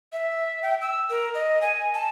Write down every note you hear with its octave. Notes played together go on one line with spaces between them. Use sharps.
E5
G5
E6
A#4
D#5
G#5
A5